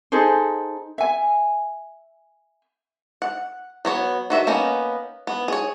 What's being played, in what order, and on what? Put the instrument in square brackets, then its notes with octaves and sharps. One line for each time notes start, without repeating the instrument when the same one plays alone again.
[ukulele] D#4 G#4 A4 C5
E5 G#5
[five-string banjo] F#5
F#3 B3 C#5
D#3 F#4 E5
A#3 B3 C#4 D#4
B3
G#4 C#5